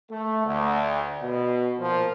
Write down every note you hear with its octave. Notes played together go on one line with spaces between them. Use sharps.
A3
D2
B2
A#2 F3